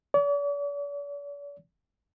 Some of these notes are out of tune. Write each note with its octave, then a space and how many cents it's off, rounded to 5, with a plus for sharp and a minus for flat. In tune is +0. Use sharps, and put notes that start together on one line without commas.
D5 -45